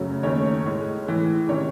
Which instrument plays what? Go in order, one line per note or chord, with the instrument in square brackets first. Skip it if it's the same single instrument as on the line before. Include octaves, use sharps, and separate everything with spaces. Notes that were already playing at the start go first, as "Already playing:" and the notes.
Already playing: [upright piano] F#2 C#3 F#3 A3 C#4
D#2 D#3 A3 C#4 C#5
A2 G#3
A2 E3 G#3
C3 D#3 C#4 C#5